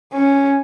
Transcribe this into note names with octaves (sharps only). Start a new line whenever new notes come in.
C#4